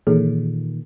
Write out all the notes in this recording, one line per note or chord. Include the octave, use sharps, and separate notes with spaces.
A#2 D#3 E3 G#4 A4